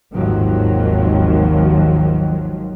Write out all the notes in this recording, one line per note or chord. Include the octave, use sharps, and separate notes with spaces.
G#1 D#2 D#3 F3 F#3